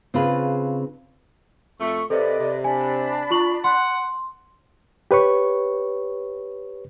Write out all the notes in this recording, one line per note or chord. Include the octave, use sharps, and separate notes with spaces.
C#3 C4 D4 F4 G#4 B4
F2 A3 C#6
C3 A4 B4 D5 D#5
C3
D4 G#5 B5
F4 C#6 F#7
F#5 C6
G4 B4 C#5 C#6